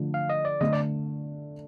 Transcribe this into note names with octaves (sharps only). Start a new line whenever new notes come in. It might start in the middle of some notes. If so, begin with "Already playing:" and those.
Already playing: D3 F3 A3
F5
D#5
D5
D3 A3 D4 D#5
D5